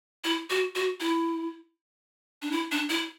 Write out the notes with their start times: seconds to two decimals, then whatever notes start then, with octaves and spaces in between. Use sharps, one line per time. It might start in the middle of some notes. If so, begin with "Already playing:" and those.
0.24 E4
0.50 F#4
0.75 F#4
1.00 E4
2.42 D4
2.52 E4
2.72 D4
2.90 E4